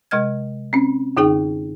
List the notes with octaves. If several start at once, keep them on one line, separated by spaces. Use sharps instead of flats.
C3 G#3 D#5 F6 G#6
C4 C#4
F#2 D3 D#4 G#4 G5